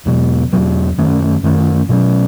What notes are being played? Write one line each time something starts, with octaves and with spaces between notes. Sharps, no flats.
E2 B2 F#3
E2 B2 F#3
F#2 D#3 A3 C#4
F#2 D#3 A3 C#4
B2 F#3 C#4